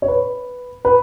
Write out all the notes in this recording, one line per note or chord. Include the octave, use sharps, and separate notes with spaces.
C#5
B4
B4